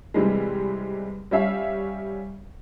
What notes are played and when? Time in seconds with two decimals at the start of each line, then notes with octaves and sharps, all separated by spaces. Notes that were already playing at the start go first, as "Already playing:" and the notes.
0.14 C3 E3 G3 G#3
1.31 G3 C#4 E5 F5